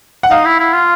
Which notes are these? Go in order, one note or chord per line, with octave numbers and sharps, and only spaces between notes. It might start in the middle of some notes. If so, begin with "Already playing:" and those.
F#5
D#4 F5
E4
E4
F4